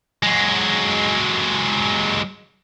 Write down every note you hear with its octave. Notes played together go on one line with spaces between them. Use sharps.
F#3 G#3